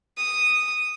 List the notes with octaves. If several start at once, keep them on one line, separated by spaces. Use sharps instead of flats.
D#6